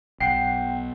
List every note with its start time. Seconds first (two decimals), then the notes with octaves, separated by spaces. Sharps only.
0.20 B1 F#5 G5 C7